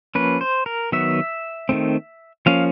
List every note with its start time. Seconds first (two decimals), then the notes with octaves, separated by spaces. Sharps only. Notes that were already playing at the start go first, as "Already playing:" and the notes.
0.15 F3 A#3 C#4 B4
0.41 C5
0.66 A#4
0.92 D#3 F#3 B3 E5
1.69 D#3 F#3 A3 C4
2.46 F3 A#3 C#4 F5